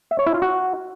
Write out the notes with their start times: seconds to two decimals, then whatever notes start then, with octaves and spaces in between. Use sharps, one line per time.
0.11 E5
0.19 C#5
0.26 E4
0.34 F4
0.42 F#4